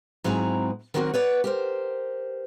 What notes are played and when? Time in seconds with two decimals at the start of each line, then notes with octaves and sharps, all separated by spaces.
0.24 G#2 F#3 C4 E4 G#4 A#5
0.94 D#3 F#3 A#3 C4 F#4 A#4
1.14 B4 C#5 D5 F#5
1.44 G4 A#4 C5